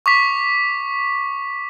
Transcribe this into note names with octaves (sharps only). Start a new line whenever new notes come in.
C#6 D6 B6